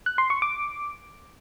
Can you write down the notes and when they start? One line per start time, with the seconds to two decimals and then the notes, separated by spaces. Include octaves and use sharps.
0.06 F#6
0.18 C6
0.30 C#6
0.42 D6